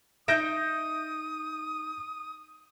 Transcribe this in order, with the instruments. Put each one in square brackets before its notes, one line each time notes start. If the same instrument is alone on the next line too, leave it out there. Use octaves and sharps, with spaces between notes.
[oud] D#4 E5 [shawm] D#6 [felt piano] G6 A#6 D7